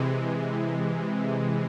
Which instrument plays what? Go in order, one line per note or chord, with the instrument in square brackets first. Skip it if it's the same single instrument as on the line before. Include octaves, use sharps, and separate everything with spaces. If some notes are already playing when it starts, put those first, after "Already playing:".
Already playing: [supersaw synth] C3 E3 G#3